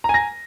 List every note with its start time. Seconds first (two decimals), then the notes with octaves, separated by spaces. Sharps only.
0.04 A#5
0.09 G#5
0.14 A#6